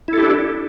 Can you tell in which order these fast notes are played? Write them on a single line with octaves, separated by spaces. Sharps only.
E4 A4 G4 D4